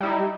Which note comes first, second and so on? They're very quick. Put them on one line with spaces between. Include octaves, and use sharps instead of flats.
G3 E4 D#4